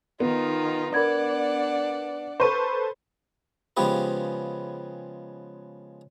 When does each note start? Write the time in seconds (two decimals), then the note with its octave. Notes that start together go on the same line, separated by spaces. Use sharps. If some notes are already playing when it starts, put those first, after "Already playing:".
0.20 D#3 B3 D#4 F4
0.94 D4 A#4 D5 F#5 B5 G#6
2.40 A4 B4 C5 C#6 D#7
3.77 C#3 F3 G#3 B3 G4 B4